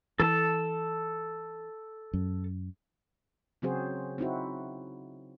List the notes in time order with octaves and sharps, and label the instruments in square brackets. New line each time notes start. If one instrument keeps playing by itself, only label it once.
[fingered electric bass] E3 [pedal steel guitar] A4 A5
[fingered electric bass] F#2
[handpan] C#3 F#3 C4 F#4 G#4 C5
C4 D#4 E4 F#4